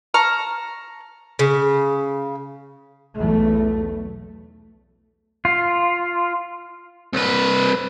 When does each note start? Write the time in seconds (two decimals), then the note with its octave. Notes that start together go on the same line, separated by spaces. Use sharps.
0.14 A5 A#5 C#6 F6
1.39 C#3
3.16 B1 E2 A3
5.45 F4
7.13 C2 B4